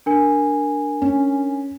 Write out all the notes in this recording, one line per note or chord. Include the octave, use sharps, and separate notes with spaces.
D4 A#4 G#5
C#4